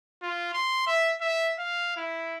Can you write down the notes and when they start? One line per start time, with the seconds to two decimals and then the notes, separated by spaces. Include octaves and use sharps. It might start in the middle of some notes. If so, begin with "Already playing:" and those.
0.23 F4
0.54 C6
0.87 E5
1.21 E5
1.59 F5
1.97 E4